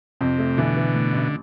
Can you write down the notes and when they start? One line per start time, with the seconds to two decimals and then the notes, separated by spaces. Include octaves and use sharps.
0.21 F2 C3
0.39 A3
0.57 B2 D3 E3
0.76 E3
0.94 A2
1.13 A1